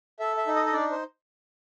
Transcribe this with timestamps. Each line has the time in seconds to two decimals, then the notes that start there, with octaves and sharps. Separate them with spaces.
0.19 A4 E5
0.37 E5
0.47 D#4
0.56 D#5
0.66 D#5
0.73 D4 D5
0.91 C5